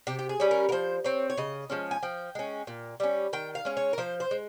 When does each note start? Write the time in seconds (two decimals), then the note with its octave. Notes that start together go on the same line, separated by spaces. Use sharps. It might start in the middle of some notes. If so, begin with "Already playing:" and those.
0.07 C3 G4
0.19 G4
0.29 G#4
0.40 G3 C#4
0.51 A#4
0.69 A#4
0.72 F3 C5
1.04 C4 C#5
1.30 C#5
1.37 C#3 D#5
1.70 F3 G#3 C#4
1.91 G#5
2.03 F3 G5
2.35 G#3 C#4
2.67 A#2
3.00 G3 C#4
3.33 D#3 G5
3.55 F5
3.65 G#3 C#4
3.77 C#5
3.93 A#4
3.98 F3 C5
4.20 C5
4.31 G#3